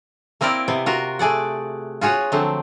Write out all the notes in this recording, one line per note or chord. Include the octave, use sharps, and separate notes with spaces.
A#3 C4 E4 A#4 D5
C3 B3
F4 F#4 A#4
A3 G#4 D5 F#5
F4 F#4 G#4 C#5 F#5
D3 F3 F#3 A3 C4